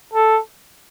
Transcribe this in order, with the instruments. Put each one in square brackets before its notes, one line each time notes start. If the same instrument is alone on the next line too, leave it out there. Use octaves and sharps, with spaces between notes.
[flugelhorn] A4